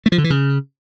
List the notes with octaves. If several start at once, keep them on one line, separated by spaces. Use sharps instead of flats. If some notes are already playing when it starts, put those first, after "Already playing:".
A3
F3
D3
E3
C#3